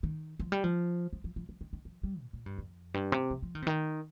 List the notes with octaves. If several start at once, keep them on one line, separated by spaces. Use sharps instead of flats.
D#3
F3
G3
F3
F3
F3
F3
F3
D#3
D#3
F3
G3
A#2
A#2
G2
F2
G2
C3
F3
F3
D#3
C3
D#3